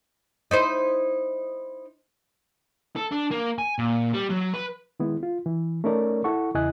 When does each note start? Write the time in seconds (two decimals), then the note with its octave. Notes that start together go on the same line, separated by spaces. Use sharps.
0.51 D#4 E4 C5
2.96 A4
3.11 D4
3.31 A#3
3.58 G#5
3.78 A#2
4.13 G3
4.30 F#3
4.54 B4
5.00 D#3 G#3 B3 E4
5.23 F4
5.46 E3
5.84 A3 C#4 D#4 A#4 C#5 D5
6.24 E4 A4 F#5 C#6
6.54 E2 C#3 E4 D#5 G#5 F#6